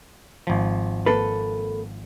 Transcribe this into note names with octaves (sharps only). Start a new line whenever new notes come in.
G#1 F3
A#3 A4 B4